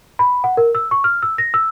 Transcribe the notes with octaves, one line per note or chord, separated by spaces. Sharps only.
B5
F#5
A#4
E6
C#6
F6
E6
A#6
E6